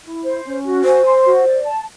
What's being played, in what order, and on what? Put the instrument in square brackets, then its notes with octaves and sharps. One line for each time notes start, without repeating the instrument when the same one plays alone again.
[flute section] E4
C5
C#4
F#4
[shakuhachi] C5 [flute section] G#5
[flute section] C6
F#4
D5
A5